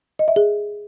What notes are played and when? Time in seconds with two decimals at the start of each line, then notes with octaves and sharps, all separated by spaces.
0.19 D#5
0.28 E5
0.36 G#4